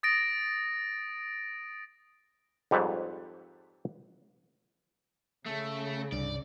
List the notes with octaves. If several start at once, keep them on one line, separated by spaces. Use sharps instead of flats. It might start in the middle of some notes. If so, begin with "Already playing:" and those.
D#6 A6 A#6 D7
F2 G#2 G3 C4 B4 C#5
C#3 A3
C2 G2 D5